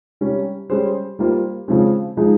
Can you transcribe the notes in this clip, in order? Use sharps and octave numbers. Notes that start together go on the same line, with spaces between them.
C3 G3 C#4
G3 C#4 G#4 C5
G3 A#3 F4 C5
C#3 F3 G#3 C4
F3 G#3 D#4 G#4